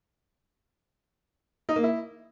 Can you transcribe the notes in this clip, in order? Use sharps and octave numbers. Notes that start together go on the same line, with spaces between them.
D#4
A#3
E4